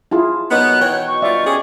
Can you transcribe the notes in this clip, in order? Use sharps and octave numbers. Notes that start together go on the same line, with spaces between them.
E4 F4 G#4 A5
B2 D#3 F#3 B3 F#6
E3 F#4 C#5 G5
C#6
G2 F4 D5 E5
C#4 G4 G#4 C#6